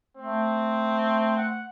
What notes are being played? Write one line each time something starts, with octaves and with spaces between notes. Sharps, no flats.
A3 C4
F#5